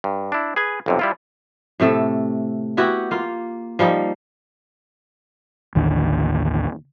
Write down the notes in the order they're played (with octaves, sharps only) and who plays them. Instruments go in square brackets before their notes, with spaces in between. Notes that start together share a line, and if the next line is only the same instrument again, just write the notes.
[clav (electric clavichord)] G2
D4 E4
G#4 B4 G#5
B1 F2 C3
G3 E4 F4
[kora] A2 C3 A3 A4
B3 E4 F#4 G4
A#3 F4
F3 G3 A#3 D#4
[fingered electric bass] A1 D#2 D3